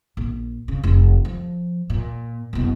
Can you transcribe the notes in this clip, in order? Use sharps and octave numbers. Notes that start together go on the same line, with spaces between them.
A#1
C#3
F1
F3
A#2
F#1 B2